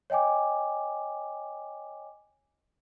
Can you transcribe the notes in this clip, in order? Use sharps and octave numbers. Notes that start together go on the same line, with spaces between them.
C#5 D#5 G5 G#5 D6